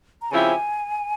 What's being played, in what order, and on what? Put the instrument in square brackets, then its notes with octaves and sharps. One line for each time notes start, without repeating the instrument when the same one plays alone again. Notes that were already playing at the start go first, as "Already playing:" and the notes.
[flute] A#5
[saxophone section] C#3 F3 C4 E4 G4 [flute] G#5